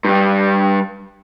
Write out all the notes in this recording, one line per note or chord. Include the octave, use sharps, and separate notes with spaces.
G2 G3